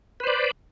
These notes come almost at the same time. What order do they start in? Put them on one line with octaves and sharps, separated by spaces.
B4 C5 D5